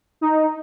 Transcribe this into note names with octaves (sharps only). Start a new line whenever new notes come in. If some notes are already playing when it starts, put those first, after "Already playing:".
D#4